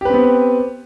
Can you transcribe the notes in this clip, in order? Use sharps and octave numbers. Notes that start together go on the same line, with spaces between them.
B3 C4 G4 B4